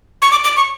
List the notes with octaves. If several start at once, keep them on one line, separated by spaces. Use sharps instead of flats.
C#6
D6
D6
C#6